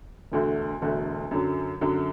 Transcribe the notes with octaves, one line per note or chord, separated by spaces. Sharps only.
E1 D2 D3 A3 F#4
E1 D2 D3 A3 F#4
F#2 D3 F#3
F#2 D3 F#3